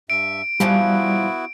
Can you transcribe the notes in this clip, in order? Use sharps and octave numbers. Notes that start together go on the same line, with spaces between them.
G2 E5 D7
A#2 E3 F3 G3 B3 E4 F#4